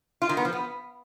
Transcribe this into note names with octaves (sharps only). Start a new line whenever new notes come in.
F4
D#3
B3
F3
B3